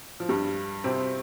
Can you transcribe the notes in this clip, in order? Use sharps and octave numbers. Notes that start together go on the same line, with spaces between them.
F3
G2 G3
C3 C4